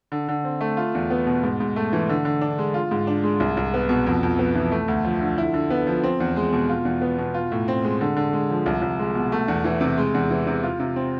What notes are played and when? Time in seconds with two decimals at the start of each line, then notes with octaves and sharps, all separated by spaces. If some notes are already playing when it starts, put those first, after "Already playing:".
0.12 D3
0.28 D3
0.44 C4
0.61 A3
0.77 F4
0.95 E2
1.10 B3
1.27 B2
1.43 G#2
1.60 G#2
1.76 A3
1.93 E3
2.09 D3
2.25 D3
2.41 D4
2.59 G#3
2.74 F4
2.91 G#2
3.07 D4
3.24 G#3
3.40 C2
3.57 C2
3.74 B3
3.89 B2
4.06 F2
4.23 F2
4.39 B3
4.55 E3
4.72 A3
4.88 D2
5.05 F3
5.21 D3
5.38 E4
5.54 D3
5.70 B3
5.87 F3
6.04 C4
6.20 E2
6.36 G#3
6.53 B2
6.69 F4
6.85 E2
7.01 B3
7.18 B2
7.34 F4
7.52 A2
7.68 C4
7.84 G#3
8.01 D3
8.16 D3
8.33 G#3
8.50 F3
8.66 C2
8.82 C2
8.99 G#3
9.15 B2
9.32 A3
9.48 E2
9.64 E3
9.81 C3
9.98 G#3
10.14 E2
10.30 E3
10.47 C3
10.63 F4
10.80 C3
10.96 C4